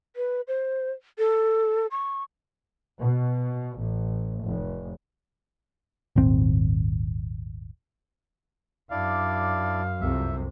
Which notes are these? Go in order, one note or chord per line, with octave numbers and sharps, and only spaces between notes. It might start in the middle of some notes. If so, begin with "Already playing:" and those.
B4
C5
A4
C#6
B2
A1
F1
D#1 G#1 C4
F#2 D4 E4 D5 F5
C2 F2 C3 E5